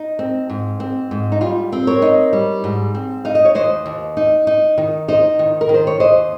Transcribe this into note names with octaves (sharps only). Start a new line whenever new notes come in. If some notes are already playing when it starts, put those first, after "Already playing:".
Already playing: D#4
C4
G#2
C4
G#2
D#4
G3 F4
C4
A#4 C#5
D#4
G3
G#2
C4
D#4 F5
D#5
C#5
D#2 C5 D#5
D#2
D#4
D#4
D#3
D#4 C5 D#5
D#3
A#4
D#3
C5
C#5
D#2 C5 D#5